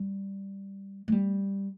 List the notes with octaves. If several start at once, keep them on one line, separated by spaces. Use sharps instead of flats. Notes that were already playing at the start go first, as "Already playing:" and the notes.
Already playing: G3
A3
G3